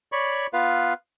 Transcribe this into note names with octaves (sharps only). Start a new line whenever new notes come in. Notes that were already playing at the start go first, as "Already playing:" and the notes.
C#5 D5 B5 C#6
B3 F4 B4 F5